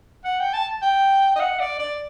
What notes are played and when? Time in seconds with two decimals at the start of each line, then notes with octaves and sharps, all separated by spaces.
0.25 F#5
0.40 G5
0.53 A5
0.82 G5
1.36 D#5
1.40 F#5
1.60 D5
1.79 D5